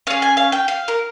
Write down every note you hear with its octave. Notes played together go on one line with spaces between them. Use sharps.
C#4 G#4 F5
G#5
F5
G5
F5
A#4